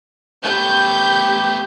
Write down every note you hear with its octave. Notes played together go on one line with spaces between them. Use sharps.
A3 B3 G4 G6